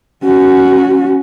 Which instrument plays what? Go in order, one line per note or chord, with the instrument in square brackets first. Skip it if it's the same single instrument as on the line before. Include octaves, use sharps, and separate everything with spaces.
[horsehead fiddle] C#4 F#4